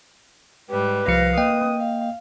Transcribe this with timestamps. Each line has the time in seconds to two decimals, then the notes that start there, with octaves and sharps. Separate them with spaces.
0.70 G#2 G3 B4
1.08 C2 F3 F5 A#6 C#7
1.38 A#3 D#5 G5 D#6
1.80 F5